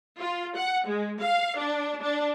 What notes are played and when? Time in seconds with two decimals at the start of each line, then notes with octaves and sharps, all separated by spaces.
0.20 F4
0.56 F#5
0.87 G#3
1.21 F5
1.58 D4
2.01 D4